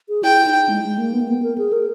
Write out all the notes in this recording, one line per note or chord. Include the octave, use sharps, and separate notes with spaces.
G#4
E4 G5
D#4
G#3
G#3
A#3
B3
A#3
B3
A#4
G#4
A#4